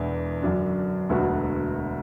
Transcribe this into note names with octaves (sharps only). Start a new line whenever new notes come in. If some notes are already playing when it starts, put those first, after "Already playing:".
Already playing: E1 E2 E3 B3 D4
F#2 D3 F#3 D4
E1 D2 D3 B3 F#4